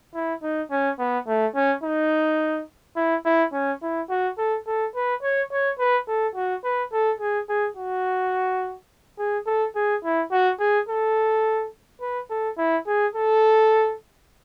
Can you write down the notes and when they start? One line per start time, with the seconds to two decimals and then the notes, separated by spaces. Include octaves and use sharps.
0.14 E4
0.42 D#4
0.71 C#4
0.99 B3
1.27 A3
1.55 C#4
1.83 D#4
2.96 E4
3.25 E4
3.53 C#4
3.82 E4
4.10 F#4
4.38 A4
4.67 A4
4.95 B4
5.22 C#5
5.52 C#5
5.79 B4
6.08 A4
6.35 F#4
6.64 B4
6.92 A4
7.20 G#4
7.49 G#4
7.77 F#4
9.19 G#4
9.47 A4
9.75 G#4
10.04 E4
10.32 F#4
10.60 G#4
10.88 A4
12.01 B4
12.30 A4
12.58 E4
12.87 G#4
13.15 A4